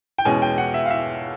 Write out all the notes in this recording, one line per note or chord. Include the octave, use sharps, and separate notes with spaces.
G5
E2 B2 G#3 C#4 G#5
G5
F#5
E5
F5
E5